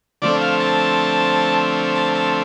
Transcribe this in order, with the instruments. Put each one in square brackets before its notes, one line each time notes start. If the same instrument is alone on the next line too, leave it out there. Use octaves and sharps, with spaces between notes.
[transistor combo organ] D3 F3 A3 C4 D5
F5
A5
A5
A5